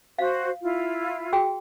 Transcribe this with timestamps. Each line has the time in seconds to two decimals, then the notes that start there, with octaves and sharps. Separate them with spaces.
0.18 F#4 C5 F5
0.62 E4 F4
1.33 F#4 G#4 G5